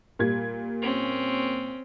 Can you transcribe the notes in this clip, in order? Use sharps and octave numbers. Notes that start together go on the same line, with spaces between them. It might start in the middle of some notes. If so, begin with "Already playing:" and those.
A#2 G3 G#6
C4 C#4